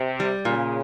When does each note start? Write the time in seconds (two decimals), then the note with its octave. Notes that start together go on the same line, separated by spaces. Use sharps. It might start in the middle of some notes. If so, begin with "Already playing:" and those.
Already playing: C3
0.20 G3
0.45 A#2 C#3